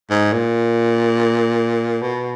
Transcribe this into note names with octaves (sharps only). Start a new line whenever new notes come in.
G#2
A#2
B2